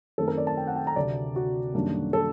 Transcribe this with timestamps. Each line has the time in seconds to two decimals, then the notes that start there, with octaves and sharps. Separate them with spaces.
0.18 F#2 D#3 A3 C4 A4
0.28 A#4
0.38 D5
0.47 A5
0.57 G5
0.67 F#5
0.76 G5
0.87 A#5
0.96 D2 C3 F#3 C4 D5
1.36 F#4
1.74 F#2 D#3 G3 A#3 D4
2.13 A4